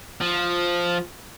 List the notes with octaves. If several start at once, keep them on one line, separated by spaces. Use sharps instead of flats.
F3